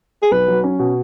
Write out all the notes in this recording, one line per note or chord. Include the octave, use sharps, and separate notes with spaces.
G#4
B1 B4
F#3
C#4
B2